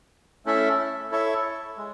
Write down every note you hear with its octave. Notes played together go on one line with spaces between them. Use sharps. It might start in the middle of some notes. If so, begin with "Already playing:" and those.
A3 C#4 E4 A4 E5
E4 A4 C#5 E5
G#3